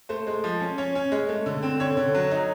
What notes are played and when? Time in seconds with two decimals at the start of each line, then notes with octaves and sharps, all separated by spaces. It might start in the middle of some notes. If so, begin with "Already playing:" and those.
0.09 A3 C5
0.27 G#3
0.44 F3
0.61 C#4
0.78 C#4 C#5
0.95 C#4
1.12 G#3
1.29 A3
1.46 D3
1.63 C4
1.80 D3 C#5
1.97 D3
2.15 F#3
2.31 D#4